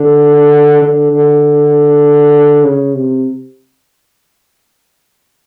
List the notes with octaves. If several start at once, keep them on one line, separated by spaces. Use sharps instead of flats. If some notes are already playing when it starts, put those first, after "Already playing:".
Already playing: D3
D3
D3
C#3
C3